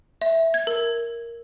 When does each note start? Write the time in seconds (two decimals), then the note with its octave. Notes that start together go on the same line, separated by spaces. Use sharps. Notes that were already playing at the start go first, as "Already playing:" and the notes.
0.22 E5
0.54 G#6
0.67 A#4